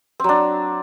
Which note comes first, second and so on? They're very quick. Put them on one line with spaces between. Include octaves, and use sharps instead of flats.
C4 F#3 D4